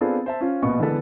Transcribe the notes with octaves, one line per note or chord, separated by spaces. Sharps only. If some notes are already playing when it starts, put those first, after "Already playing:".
B3 C4 D4 F4 G#4 A4
C5 E5 A5
C#4 F4 C5
A#1 B2 B3 D#5 C#6
D3 E3 G#3 B3 A4 B4